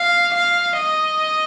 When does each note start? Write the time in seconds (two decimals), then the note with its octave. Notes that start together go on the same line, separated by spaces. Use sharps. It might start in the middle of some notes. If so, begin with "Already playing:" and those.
Already playing: F5
0.34 F5
0.77 D#5